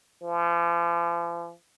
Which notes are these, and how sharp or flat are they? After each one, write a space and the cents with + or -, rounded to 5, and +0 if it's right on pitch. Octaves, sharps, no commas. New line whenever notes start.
F3 -40